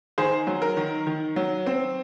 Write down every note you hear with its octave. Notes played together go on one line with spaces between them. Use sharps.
D#3 G#4 C5
F#3
A#4
D#3
D#3
F#3
C4